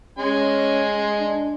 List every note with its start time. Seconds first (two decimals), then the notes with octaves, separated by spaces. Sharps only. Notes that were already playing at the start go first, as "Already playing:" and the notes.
0.19 G#3 C#4 G#5 C6
1.19 D4